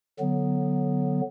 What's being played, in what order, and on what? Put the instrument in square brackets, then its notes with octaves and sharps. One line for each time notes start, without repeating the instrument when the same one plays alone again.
[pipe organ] D3 F#3 B3